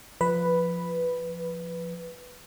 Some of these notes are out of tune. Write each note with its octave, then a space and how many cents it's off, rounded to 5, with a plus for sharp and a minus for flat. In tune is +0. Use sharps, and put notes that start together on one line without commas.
F3 +0 B4 +0